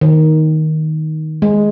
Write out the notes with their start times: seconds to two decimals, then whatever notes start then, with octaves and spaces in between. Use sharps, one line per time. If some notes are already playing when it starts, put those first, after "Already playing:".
0.01 D#3
1.42 G#3